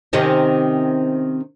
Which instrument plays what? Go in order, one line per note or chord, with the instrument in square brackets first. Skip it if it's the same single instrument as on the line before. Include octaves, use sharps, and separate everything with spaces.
[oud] C3 D#3 C#4